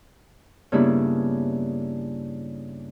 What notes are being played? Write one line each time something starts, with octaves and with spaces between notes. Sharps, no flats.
G2 C#3 A#3 B3 D4 E4